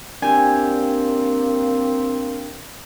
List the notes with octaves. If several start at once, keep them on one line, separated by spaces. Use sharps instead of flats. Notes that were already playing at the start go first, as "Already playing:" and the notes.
A#3 C4 D4 G4 G#5